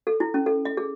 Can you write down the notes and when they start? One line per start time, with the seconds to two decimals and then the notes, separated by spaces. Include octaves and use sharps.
0.07 A4
0.20 E4
0.34 C#4
0.46 A4
0.65 D#5
0.77 G#4